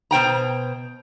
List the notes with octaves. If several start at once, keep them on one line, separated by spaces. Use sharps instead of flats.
B2 C5 G5 A#5